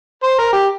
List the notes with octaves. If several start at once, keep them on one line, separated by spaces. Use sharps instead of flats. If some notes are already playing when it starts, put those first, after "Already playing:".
C5
A#4
G4